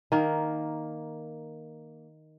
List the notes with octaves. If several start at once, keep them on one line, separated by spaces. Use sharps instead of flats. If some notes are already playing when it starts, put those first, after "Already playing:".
D#3 A#3